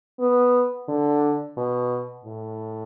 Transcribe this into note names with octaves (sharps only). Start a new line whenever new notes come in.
B3
D3
B2
A2